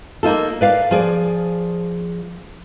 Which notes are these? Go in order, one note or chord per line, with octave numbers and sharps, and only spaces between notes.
A#3 D#4 F4 A4
B4 D5 F5
F3 G#4 D5